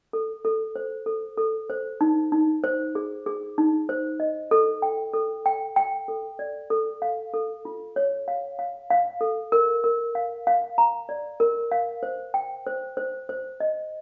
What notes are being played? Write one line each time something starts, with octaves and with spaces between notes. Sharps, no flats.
A4
A4
C5
A4
A4
C5
D#4
D#4
C5
G#4
G#4
D#4
C5
D#5
A4
G5
A4
G5
G5
A4
D5
A4
F5
A4
F4
C#5
F5
F5
F5
A4
A#4
A#4
F5
F5
A#5
D5
A#4
F5
C5
G5
C5
C5
C5
D#5